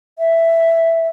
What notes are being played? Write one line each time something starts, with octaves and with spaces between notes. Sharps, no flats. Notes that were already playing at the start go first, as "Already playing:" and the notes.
E5